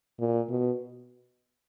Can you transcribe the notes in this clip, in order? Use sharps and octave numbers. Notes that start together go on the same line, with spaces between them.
A#2
B2